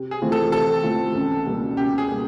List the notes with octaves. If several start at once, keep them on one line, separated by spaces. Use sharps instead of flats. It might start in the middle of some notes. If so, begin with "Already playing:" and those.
Already playing: C3
G#4
E3 A3 C4 F4
A4
C3 A4
E3 A3 C4 F4
C#2
B2 G3 A#3
C#2 G4
G#4
B2 G3 A#3